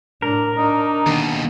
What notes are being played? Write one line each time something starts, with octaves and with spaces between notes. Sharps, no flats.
A2 D4 A#4
D4 D#4
D#2 B2 D#3